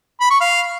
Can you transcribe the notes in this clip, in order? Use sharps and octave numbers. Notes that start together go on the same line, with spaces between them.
B5
C#6
F5